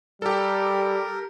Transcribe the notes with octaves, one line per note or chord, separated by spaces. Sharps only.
G3 G4 A4 A#4